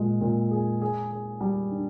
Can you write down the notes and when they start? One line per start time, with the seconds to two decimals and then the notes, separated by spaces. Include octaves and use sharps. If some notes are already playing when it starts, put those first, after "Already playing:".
Already playing: A#2 G#3
0.21 A#2
0.51 G#4
0.81 G#4
1.11 G#4
1.41 G3
1.71 D4